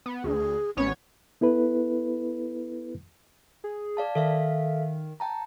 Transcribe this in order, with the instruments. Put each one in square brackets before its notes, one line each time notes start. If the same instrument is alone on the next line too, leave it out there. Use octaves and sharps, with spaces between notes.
[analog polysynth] B3
[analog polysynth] D2 [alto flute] G#4
[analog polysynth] A1 B3 C#5 [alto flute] C#4
[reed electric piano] B3 E4 A4 B4
[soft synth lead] G#4
[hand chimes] D5 F5 A5
[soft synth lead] D#3 [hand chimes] A4 E5 F5
[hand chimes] G5 A5 A#5